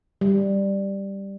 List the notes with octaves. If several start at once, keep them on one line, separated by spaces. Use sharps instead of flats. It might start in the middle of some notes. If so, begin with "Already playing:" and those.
G3